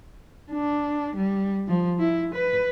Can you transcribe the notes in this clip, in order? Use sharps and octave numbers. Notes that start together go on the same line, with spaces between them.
D4
G3
F3
E4
B4